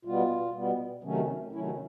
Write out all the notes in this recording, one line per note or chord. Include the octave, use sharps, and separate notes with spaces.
B2 G3 B3 F4
B2 G3 B3
C3 D#3 F#3 A3 C#4
C3 D#3 F#3 A3 C#4 E4